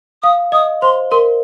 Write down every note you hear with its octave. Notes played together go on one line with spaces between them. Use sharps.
F5 D#6
D#5 D#6
C5 C6
A#4 C6